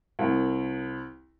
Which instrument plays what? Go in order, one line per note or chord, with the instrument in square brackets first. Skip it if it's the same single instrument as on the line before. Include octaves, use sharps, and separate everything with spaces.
[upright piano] C2